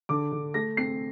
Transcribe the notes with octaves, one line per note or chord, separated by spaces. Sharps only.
D3 D6
D3
A3 A#6
C4 C7